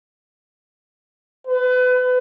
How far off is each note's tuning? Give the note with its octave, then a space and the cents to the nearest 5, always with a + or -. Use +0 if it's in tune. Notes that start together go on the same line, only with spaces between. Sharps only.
B4 +30